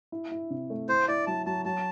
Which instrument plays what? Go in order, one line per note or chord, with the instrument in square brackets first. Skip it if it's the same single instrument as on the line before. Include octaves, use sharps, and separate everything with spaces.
[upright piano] E4
E4
C3
A3
[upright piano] E4 [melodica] C5
[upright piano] E4 [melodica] D5
[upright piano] F#3 [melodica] A5
[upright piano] F#3 [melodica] A5
[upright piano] F#3 [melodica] A5